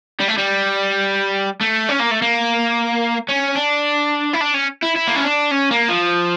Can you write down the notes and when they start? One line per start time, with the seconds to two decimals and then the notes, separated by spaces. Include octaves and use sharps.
0.20 G3
0.28 A3
0.38 G3
1.61 A3
1.89 C#4
1.99 A#3
2.11 A3
2.22 A#3
3.29 C#4
3.55 D4
4.33 E4
4.40 D4
4.54 C#4
4.82 E4
4.96 E4
5.07 A#3
5.16 C#4
5.24 D4
5.51 C#4
5.71 A#3
5.88 F3